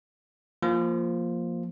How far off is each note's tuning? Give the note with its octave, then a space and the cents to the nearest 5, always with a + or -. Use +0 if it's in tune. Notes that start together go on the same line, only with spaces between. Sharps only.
F3 +0 A#3 +0 F4 +0